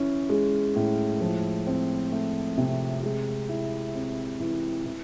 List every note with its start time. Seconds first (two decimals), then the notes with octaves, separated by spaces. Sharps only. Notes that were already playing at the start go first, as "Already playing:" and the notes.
Already playing: E3 C#4
0.29 G#3
0.76 A2
1.21 F3
1.67 C4
2.12 A3
2.58 C3
3.03 G#3
3.49 E4
3.95 C4
4.40 E3
4.85 E3